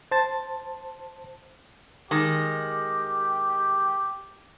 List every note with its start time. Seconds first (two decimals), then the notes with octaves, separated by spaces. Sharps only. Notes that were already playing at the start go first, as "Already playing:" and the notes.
0.11 C5 A5 A6
2.11 D#3 G#3 G4